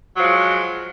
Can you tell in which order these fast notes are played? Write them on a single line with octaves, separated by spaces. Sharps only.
F#3 F3 G#3